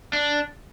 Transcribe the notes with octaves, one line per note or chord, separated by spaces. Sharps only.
D4